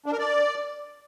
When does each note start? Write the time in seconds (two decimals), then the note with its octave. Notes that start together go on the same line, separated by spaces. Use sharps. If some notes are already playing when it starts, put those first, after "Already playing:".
0.06 D4
0.12 A#4
0.19 D5